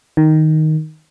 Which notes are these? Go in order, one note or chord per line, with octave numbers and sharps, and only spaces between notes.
D#3